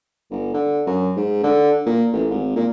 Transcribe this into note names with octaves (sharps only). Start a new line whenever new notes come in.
G1
D3
F#2
G#2
D3
A#2
A1
G#1
A#2